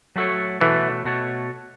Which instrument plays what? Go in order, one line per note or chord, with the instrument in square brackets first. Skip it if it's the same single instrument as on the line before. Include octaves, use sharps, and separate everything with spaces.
[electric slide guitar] F#3 A3 F#4 A4 C#5
[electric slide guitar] B2 A3 F#4 A4 C#5 [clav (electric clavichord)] E3
[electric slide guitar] B2 A3 F#4 A4 C#5